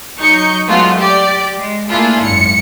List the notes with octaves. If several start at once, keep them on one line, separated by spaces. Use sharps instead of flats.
F#3 D#4 C#6 G6 C#7
F#3 G#3 A3 B3 F4 F#4
G4 D5
G#3
A3 A#3 D4 E4 F4 G#4
G#1 F#2 C#7